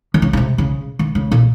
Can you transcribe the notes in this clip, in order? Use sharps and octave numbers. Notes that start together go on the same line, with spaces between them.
D#3
C#3
C#3
C3
C#3
D#3
C#3
A#2